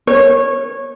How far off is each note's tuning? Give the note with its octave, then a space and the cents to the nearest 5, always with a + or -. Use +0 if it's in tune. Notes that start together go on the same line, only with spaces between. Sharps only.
C#5 -20